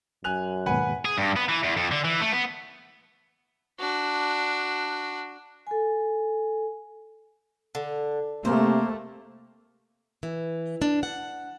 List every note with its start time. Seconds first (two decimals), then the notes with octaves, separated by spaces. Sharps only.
0.24 F#2 G#5 F#6 F7
0.66 D#2 G#2 B2 B4 F#5 G#5
1.05 G#4
1.18 G2
1.36 B3
1.49 E3
1.63 E2
1.76 F2
1.91 D3
2.04 E3
2.21 A3
2.32 B3
3.80 D4 F#4
5.67 A4 G#5
7.75 D3
8.45 C3 A3 A#3 C5
10.23 E3
10.82 D4
11.03 F#5